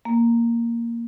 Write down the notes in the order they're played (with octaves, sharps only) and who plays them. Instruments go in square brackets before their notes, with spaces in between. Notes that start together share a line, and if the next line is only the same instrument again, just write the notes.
[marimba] A#3